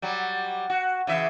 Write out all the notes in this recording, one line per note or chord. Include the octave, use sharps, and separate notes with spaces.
F#3 G3
F#4
C#3 E3 E5